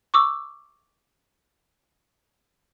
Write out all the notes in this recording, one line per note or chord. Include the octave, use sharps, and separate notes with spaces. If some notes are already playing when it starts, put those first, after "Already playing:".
C#6 D6 E6